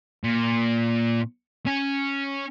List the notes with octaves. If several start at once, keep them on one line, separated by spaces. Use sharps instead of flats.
A#2
C#4